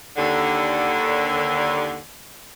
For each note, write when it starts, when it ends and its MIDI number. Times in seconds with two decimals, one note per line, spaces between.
0.17 1.97 39
0.17 1.97 50